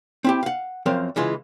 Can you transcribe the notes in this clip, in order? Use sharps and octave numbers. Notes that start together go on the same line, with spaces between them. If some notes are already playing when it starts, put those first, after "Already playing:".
C4 E4 G4
F5 F#5
F#2 F3 C4 A#4 C5 F5
C#3 E3 G#3 F4